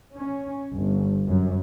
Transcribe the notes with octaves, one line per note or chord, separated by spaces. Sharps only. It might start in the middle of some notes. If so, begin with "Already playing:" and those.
C#4
G1
F#2